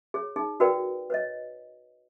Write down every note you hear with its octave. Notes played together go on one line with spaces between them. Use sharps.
G#4 C#5
D#4 G#4
F#4 A#4 B4 D5 G5
B4 C#5 D#5